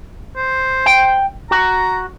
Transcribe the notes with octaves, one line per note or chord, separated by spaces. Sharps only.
C5
G5
F#4 A#5